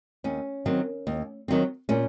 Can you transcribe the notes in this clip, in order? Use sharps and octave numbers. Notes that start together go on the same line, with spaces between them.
D#2 C#4
D#3 F#3 C4
D#2
D#3 F#3 C4
A#2 C#4